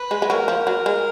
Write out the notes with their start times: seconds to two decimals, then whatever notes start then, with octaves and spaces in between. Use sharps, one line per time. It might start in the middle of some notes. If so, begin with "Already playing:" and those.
Already playing: B4
0.11 G#3
0.22 G#3
0.30 F#3 A#4
0.48 F3
0.67 F#3
0.86 G#3